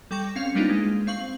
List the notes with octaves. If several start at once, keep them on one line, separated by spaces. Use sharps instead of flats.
G3 A4 G5 C#6 A#6
C4 C#4 F5 C#7 F7
G3 A#3 B3 D4 D#4 F4
G#3
C4 F5 C#6 F#7